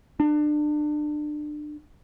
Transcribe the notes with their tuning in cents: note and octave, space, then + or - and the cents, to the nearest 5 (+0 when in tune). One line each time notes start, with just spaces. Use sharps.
D4 +30